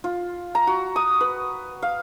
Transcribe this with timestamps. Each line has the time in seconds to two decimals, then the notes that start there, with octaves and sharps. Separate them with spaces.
0.04 F4
0.55 A#5
0.67 F#4
0.96 D#6
1.21 B4
1.82 F5